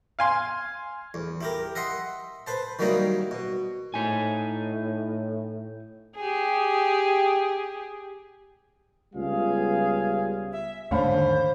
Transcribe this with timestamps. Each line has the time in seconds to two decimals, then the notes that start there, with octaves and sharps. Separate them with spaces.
0.19 F5 G#5 C6
1.14 E2
1.41 E4 G4 A#4
1.75 D#5 E5 F#5 C6
2.47 B4 C5 A5
2.79 D#3 F#3 G3 A#3 D#4 E4
3.31 B2
3.94 A2 D#4 G#5
6.16 G4 G#4
9.14 C#2 G3 B3 F4 G#4 F5
10.52 E5
10.91 E2 G#2 D3 C5 C#5 F5 B5
11.14 D#3